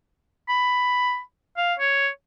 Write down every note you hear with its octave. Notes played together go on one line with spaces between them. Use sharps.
B5
F5
C#5